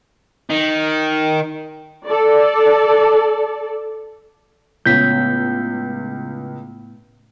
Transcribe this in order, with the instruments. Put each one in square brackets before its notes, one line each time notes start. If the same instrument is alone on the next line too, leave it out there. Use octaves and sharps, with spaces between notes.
[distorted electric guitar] D#3
[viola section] A4 D5
[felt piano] C#2 [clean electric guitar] A2 B3 C#5 [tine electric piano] G6 B6